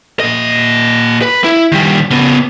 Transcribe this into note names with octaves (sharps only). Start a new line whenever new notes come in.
A#2 D#5
B4
E4
D#3 G3
C#3 B3